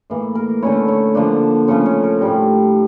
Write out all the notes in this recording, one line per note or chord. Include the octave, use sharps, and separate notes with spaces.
A2 E3 A#3
A#4
D3 A3 C#4 E4 C#5
C#5
D3 F3 A#3 D4
C#3 F3 A3 C#4 C#5
C#5
A#4
A2 G3 D4 G4